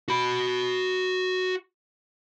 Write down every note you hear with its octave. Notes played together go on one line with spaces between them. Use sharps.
F#4 B5